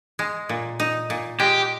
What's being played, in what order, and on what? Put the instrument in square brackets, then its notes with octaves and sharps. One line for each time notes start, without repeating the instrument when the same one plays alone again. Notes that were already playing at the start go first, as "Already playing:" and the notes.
[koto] G#3
A#2
D#4
A#2
[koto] G#3 [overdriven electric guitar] G4